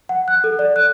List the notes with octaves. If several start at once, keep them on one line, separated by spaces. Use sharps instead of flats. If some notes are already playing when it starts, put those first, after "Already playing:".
F#5
F#6
A4
D5
F#6